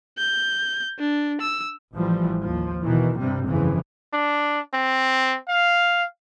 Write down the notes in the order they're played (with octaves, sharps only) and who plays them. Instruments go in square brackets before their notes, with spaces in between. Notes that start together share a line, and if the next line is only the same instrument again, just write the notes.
[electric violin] G6
D4
E6
[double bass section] A1 E3 F3 G3
D#2 F3
B2 D#3 E3
G2 C3 G3
G1 F2 C#3 E3
[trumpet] D4
C4
F5